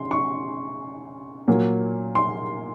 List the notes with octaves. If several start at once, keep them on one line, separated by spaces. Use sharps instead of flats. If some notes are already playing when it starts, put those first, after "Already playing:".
Already playing: C#3 C6
C#6
A#2 F#3 A#3
C6